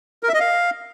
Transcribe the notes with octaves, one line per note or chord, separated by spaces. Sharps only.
A#4
E5
D#5
F5